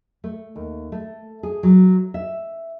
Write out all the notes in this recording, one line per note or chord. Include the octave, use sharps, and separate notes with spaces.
A3
D#2
A3
G#4
F#3
E5